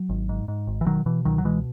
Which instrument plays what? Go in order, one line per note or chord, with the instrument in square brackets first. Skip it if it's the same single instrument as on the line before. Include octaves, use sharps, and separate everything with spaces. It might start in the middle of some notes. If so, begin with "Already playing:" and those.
Already playing: [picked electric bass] F#3
G#1
G#2
G#2
G#1
E3
B2 D#3 F#3
B2 E3
C#2 D#3 F#3
F#3
B2 E3 G#3